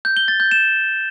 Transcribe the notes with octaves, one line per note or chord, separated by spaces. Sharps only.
G6
G7
A6
G6
E7